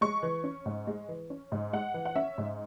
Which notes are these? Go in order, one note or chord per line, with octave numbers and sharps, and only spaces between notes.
G#3 C#6
E3
C#4
G#2
G#3
E3
C#4
G#2
G#3 F#5
E3
F#5
C#4 E5
G#2